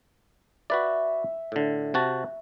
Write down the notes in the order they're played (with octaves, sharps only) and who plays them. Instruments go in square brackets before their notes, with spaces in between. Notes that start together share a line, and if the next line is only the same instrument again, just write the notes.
[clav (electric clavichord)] F#4 B4 D5 [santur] E5
[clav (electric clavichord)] A2 D3
C3 F#4 A5